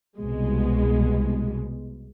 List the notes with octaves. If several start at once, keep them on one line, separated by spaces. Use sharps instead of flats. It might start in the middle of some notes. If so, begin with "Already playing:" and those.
C2 B2 G#3